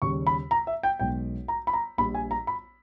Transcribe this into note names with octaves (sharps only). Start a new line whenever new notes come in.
D#2 C#3 G3 C#6
B5
A#5
E5
G5
B1 B2 G#3 G5
A#5
B5
A#5
A#1 A#2 G3 B5
G#5
A#5
B5